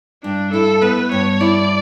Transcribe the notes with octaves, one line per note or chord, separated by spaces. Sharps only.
G2 D4
E4 A4
B3 B4
G2 C#5
E4 D5